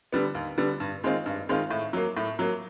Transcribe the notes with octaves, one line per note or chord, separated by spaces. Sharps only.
D3 G3 B3
D#2
D3 G3 B3
G2
D#3 G#3 C4 F4
G2
D#3 G#3 C4 F4
A2
F#3 A#3
A2
F#3 A#3